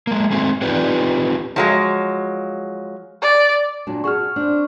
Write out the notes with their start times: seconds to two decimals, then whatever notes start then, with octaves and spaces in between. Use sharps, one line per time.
0.07 G#3 A#3
0.31 G#3 A3 C4 F#4
0.62 C4 D#4 F4 G4 B4 D5
1.56 F3 F#3 G#3
3.22 D5
3.87 A#2 F#3 D4
4.04 F#4 G#4 A5 C#6 F6
4.36 C4 D4